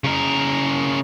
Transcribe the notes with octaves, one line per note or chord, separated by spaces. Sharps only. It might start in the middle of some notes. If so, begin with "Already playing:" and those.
C#3 A#4